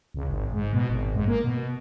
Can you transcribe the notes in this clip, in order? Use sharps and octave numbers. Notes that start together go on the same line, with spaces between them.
C#2
G#1
G#2
B2
G#1
G#2
A#3
B2